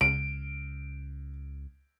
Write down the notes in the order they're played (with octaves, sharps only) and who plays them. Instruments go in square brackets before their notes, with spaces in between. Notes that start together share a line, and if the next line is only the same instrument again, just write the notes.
[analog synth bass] C#2 [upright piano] D7